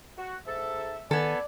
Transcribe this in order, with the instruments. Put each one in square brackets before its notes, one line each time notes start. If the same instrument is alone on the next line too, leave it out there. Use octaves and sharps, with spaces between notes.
[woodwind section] F#4
[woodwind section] G#2 A4 [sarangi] E5
[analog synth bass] D#3 [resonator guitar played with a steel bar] B3 A4 [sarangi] D5 [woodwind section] G#5